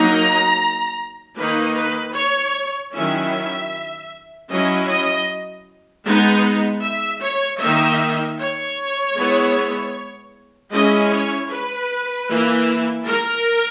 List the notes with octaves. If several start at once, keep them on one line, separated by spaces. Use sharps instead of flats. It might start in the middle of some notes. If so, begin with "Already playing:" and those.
Already playing: F#3 A#3 D#4 A#5
D#3 A#3 D#4 B4
B4
C#5
D#3 F#3 C#4 E4 E5
F#3 C#4 E4 D#5
D#5
G#3 B3 D#4
E5
C#5
D#3 A#3 D#4 E5
C#5
G#3 B3 E4
G#3 C#4 E4 D#5
C#5
B4
E3 A#3 E4
A#4